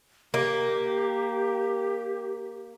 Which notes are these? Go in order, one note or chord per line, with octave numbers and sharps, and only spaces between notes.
A#3 G4